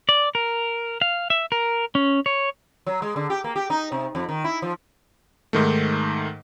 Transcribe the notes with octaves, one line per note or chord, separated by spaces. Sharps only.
D5
A#4
F5
E5
A#4
C#4
C#5
F#3
G#3
D3
G4
A#3
G4
D#4
C3
F2
D#3
E4
F3
G#2 D#3 A3